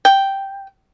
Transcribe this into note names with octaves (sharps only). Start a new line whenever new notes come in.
G5